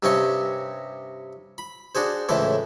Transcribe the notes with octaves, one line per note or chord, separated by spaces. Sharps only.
G2 C3 C4 C#4 D#5 C#6
B5
D4 F#4 G#4 C5
C#2 A2 E3 A3 C5